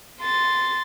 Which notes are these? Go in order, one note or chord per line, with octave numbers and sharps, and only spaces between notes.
C6 A6